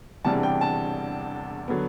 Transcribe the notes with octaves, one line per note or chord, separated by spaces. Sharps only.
E1 E2 C3 G3 D4 A5
G5
A5
D3 F#3 B3